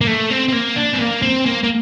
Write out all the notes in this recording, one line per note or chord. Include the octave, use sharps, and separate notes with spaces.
A#3
A3
C4
C4
A#3
D4
C4
A#3
C4
A#3
A#3